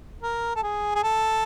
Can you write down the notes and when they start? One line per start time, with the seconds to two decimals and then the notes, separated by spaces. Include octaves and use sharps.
0.23 A#4
0.56 A4
0.63 G#4
0.95 G#4
1.03 A4